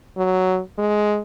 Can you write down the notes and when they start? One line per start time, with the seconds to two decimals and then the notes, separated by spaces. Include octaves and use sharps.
0.17 F#3
0.78 G#3